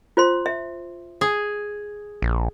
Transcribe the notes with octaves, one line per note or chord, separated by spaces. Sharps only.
F4 C5 C6
E5
G#4
A#1